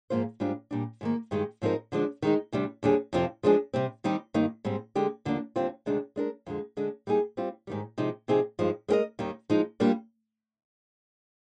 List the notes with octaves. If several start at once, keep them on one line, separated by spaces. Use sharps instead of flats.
G#2 F3 A#3 F4 C5
G#2 G3 D4 F4 C5
A#2 G3 D4
G#2 D#3 A#3
G2 D#3 G#3 D#4 G4
G#2 F3 C4 D#4 A#4
D3 F3 G#3 D4
D#3 G#3 D#4
D2 C3 G3 D4
D#2 D3 G3 D4 G#4
F2 C3 F3 C4 F4
F3 G#3 D4 G#4
C3 G3 C4
D#3 G3 C4 D#4 G4
G2 D#3 A#3 D#4
G#2 G3 C4
D3 G#3 D4 G4
D#2 D3 F3 A#3 D4
D#2 D3 G3 C4 F4
D2 C3 D#3 G#3 D4
G#3 D4 G4 A#4
F2 D3 G#3
D3 G#3 D4
G3 A#3 D#4 G#4
G3 C4 F4
G#2 D#3 G3
C3 F3 G#3 D#4
C3 F3 C4 D#4 G#4
G2 F3 G#3 D#4
G#3 C4 G4 A#4 D#5
D#2 D#3 G3
F3 G#3 D#4
G3 A#3 D4 F4